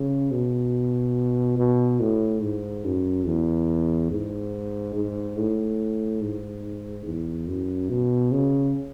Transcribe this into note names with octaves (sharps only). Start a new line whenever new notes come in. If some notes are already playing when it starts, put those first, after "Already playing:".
Already playing: C#3
B2
B2
A2
G#2
F#2
E2
G#2
G#2
A2
G#2
E2
F#2
B2
C#3